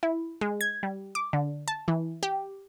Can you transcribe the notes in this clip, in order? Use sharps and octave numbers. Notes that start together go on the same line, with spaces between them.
E4
G#3
G#6
G3
D6
D3
A5
E3
G4